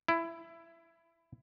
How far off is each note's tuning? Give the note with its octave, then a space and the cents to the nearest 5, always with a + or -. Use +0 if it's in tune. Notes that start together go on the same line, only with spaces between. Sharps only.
E4 +15